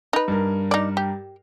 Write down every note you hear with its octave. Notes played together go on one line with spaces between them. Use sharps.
D#4 B4
G2 A#4
D#4 D5
G4